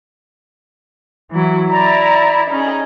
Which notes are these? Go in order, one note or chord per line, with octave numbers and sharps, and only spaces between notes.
E3 F#3 E4
E4 D5 E5 A#5
C#4 D#4 G#4